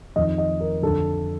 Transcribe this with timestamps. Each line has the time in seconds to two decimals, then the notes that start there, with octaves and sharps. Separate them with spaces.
0.16 F2 D#3 D#5
0.38 D#5
0.61 A#4
0.82 F2 D3 A4